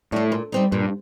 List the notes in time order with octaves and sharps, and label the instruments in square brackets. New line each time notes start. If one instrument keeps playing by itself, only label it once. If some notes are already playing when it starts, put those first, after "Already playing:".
[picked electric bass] A2 [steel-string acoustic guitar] A3 D4
[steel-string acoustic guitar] A#2
G3 C4 D#4
[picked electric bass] G2 [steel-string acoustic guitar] A#2